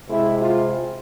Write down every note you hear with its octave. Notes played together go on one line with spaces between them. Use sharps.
C3 G#3 E4
F4